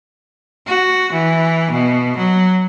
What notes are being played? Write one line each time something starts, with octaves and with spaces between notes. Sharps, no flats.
F#4
E3
B2
F#3